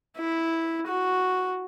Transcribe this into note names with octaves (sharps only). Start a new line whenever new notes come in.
E4
F#4